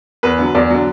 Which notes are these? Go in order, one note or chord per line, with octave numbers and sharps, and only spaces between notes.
E2 B4
D3 F#3
E2 D5
D3 F#3